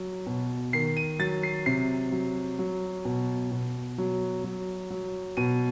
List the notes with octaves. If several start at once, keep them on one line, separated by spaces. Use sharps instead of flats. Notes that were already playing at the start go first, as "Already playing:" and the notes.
Already playing: F#3
B2
D#3 C7
D#7
F#3 A6
C7
C3 C7
F#3
F#3
B2
B2
F#3
F#3
F#3
B2 D#7